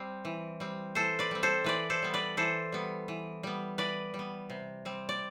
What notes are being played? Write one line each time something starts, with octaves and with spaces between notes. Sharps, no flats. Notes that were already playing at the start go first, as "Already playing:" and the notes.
Already playing: G3 C4
E3
G3 C4
E3 A4 C5
B4 D5
G3 C4
A4 C5
E3 B4 D5
A4 C5
G3 B3
B4 D5
E3 A4 C5
G3 B3
E3
G3 B3
E3 B4 D5
G3
B3
C3
G3 C4
D5